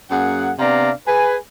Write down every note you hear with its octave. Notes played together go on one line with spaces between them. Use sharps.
F#2 A#3 G#4 F#5
C3 B3 D4 D5 F5 A#5
G#4 B4 G#5